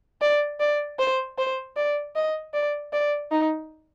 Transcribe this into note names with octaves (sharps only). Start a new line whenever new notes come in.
D5
D5
C5
C5
D5
D#5
D5
D5
D#4